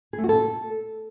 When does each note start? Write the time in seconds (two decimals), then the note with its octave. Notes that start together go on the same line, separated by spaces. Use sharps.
0.13 G#4
0.18 A3
0.24 F#4
0.29 A4